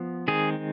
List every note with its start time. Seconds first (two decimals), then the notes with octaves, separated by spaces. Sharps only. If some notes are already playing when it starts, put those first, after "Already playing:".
Already playing: F3 B3
0.28 D#3 G#3 C4 G#4